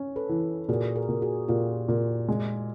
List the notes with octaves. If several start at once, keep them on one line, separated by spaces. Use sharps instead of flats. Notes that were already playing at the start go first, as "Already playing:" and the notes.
Already playing: C#4
A4 B4
E3
A#2 F#4 G#4
G#4 A#4
A#2
F#4 G#4
A#2 F4 G4
A#2
G#3